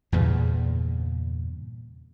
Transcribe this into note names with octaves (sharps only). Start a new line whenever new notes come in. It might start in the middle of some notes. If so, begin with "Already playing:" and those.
E2 G2 A#2 C#3